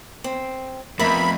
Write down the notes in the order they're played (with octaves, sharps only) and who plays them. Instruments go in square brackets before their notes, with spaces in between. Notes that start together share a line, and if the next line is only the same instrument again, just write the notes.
[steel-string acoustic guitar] C4
[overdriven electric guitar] F2 [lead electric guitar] A3 B3 [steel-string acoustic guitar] A#4 E5 [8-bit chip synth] B5